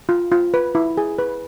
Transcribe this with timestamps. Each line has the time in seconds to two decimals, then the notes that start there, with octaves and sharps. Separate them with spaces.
0.09 F4
0.32 F4
0.54 B4
0.75 E4
0.97 G#4
1.19 B4